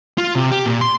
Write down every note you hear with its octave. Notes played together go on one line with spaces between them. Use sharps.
F4
C3
G4
A#2
C6